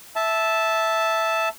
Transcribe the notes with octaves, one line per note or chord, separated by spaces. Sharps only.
E5 A5